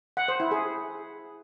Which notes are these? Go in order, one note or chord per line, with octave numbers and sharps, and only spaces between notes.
F#5
C5
E4
G#4